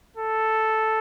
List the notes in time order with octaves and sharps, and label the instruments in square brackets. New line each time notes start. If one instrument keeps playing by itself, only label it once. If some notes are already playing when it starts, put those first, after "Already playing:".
[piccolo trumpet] A4